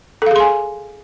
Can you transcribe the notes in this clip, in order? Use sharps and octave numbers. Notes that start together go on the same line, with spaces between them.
G#4 A4 F5 G#5 C6